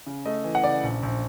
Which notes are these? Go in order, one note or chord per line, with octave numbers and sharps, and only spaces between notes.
C#3
A3 D#5
E3
F#5
C#3 D5
A#1
A#1